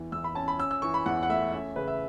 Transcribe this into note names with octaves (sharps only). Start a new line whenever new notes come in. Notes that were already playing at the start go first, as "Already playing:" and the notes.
Already playing: E2 E3
E2 E6
B5
C#4 A5
B5
C#4 E6
E6
E3 C#6
B5
E2 F#5
F#5
A3 E5
C#4 E5
C#3 B4
E5